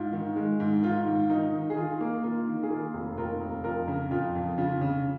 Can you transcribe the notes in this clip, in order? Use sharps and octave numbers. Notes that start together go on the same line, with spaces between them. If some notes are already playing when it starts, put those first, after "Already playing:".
Already playing: G#2 F4
D#3
G#3
G#2
D#3 F4
G#2
D#3 D#4
D#3
G#4
D#3 F4
A#3
A#3 F4
D#3
G#4
A#3 F4
F1
D#2 F4 A#4
F1
F2 F4 A#4
C#3
F2 F4
F2
C#3 F4
C#3